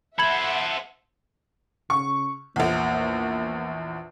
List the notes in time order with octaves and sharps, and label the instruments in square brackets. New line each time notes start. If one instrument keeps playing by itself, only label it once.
[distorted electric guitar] A4 C5 [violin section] E5 F#5 [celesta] B5 G#6 F#7
[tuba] C#3 [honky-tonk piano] C#6
[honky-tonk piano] A#1 E2 [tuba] A#3